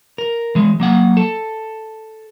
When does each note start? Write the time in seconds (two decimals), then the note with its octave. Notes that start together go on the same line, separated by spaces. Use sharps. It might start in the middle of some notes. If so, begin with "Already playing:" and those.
0.18 A#4
0.55 E3 G#3
0.80 F#3 A#3 F#5
1.17 A4